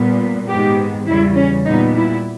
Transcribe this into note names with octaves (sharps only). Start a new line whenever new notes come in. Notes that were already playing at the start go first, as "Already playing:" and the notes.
Already playing: A#2 G3 B3
G#2 D#3 G#3 B3 G4
E2 C#3 G3 E4
C#4
A#2 G3 B3 D#4
E4